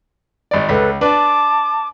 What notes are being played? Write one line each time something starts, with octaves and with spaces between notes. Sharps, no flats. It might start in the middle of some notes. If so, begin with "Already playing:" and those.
G#1 D5
C#2 A4 B4 B5
D4 B4 A5 D6